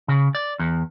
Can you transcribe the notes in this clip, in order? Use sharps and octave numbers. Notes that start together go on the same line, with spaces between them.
C#3
D5
E2